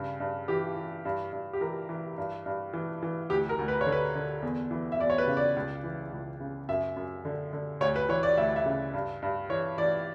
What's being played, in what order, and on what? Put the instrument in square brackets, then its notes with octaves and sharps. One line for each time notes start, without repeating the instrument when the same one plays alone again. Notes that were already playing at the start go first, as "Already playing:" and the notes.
Already playing: [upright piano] G2 C#3
G2
E3 G4
E3
G2
G2
G4
E3 A#4
E3
G2
G2
E3
E3
D2 G4
A#4
D2
B4
C#5
D3
B4
D3
E2
E3
E5
E2 D5
C#5
B4
C#3
D5
C#2
E3
C#2
C#3
F#2 E5
F#2
D3
D3
D2 C#5
B4
E3 C#5
D5
D2 E5
E5
C#3
G2
G2
E3 C#5
E3 D5